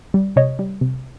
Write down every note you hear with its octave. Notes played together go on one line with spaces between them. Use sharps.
G3
C3 C#5 D#5
G3
C3